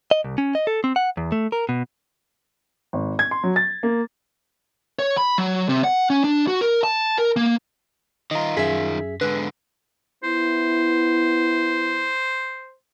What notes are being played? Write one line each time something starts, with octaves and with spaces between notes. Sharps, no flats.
D#5
C2
C#4
D#5
A4
C4
F#5
E2
A3
A#4
B2
G#1
G#6
C6
F#3
A6
A#3
C#5
B5
F#3
C3
F#5
C#4
D4
F#4
A#4
A5
A#4
A#3
D#3 F4 D#5 A#5
F#2 G#4 E5 B6
G#2 D3 B4
B3 E4 C5